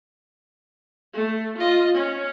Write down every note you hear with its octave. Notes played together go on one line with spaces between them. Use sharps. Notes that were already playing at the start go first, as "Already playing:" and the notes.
A3
F4 D#5
C#4